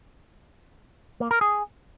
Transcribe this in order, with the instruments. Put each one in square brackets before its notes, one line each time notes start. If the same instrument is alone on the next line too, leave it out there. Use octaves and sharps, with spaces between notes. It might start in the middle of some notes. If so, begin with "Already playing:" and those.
[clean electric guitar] A#3
A#4
G#4